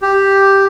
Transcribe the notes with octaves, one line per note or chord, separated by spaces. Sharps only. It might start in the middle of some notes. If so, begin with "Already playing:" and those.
G4